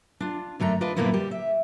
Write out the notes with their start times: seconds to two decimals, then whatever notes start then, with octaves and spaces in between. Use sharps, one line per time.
0.20 D4 F4
0.60 F#2 D3 A3 A#5
0.81 D4 F4 B4 D#5
0.96 F#2 A#2 D3 A#3 B3 E4
1.13 G3 G4
1.31 E5